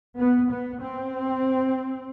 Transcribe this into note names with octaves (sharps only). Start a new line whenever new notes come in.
B3
B3
C4